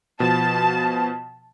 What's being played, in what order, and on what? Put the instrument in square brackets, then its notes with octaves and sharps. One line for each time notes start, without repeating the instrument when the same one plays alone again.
[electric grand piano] B2 F3 [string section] A5